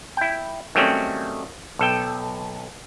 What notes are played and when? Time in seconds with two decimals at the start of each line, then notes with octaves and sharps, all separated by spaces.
0.17 E4 G5
0.75 D#3 F#3 G3 A3 C4 C#4
1.79 B1 A4 G5